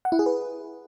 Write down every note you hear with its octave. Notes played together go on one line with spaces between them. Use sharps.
F#5
E4
G#4
B4